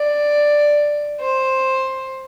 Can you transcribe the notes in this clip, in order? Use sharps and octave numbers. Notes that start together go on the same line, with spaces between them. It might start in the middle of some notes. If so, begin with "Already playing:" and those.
Already playing: D5
C5